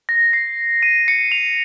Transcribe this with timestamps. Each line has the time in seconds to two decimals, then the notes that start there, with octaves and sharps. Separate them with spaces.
0.09 A#6
0.33 C7
0.83 D#7
1.08 C#7
1.32 F7